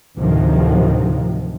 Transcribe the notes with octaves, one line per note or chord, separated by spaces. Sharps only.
D2 A2 C3 D#3 F3 F#3